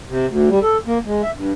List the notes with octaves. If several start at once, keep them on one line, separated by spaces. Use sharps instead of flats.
C3
D2
G3
A4
A#3
G#3
E5
G2